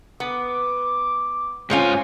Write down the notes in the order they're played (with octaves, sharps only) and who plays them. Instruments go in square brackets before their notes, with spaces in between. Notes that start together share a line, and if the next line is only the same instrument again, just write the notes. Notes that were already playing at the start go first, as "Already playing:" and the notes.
[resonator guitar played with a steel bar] B3 [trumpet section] D6
[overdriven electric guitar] G#2 G#5 [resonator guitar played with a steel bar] C4 C#4 F4